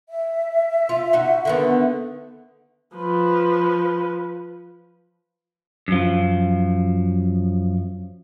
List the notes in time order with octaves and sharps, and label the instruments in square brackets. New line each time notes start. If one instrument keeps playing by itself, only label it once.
[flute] E5
[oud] F4
D#4 F#4
D3 D#3 B3
[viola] F3 B4
[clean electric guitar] F#2 F3